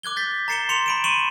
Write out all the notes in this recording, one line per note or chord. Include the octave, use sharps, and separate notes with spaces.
D6 F#6 G#6 G7
G6 A6 B6
A#5 A6 C7 C#7 E7 G7
C6 C7 C#7 F7
B5 D7 E7
C6 C#6 D#7 E7 F#7